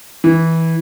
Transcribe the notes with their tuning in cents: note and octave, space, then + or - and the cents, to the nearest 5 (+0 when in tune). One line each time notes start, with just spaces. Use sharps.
E3 -15